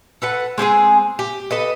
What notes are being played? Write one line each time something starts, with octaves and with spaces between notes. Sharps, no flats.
A4 B4 F#5
G#3 C4 G4 G#4
G4
A4 B4 D#5